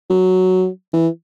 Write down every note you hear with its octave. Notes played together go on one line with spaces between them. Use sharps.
F#3
E3